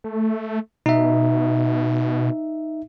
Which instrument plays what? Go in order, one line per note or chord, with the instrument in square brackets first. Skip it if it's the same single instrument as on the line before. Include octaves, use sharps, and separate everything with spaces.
[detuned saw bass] A3
[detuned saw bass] B2 [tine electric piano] D#4 E5